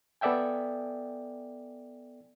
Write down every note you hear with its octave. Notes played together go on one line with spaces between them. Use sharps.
B3 A4 D5 E5 G5 G#5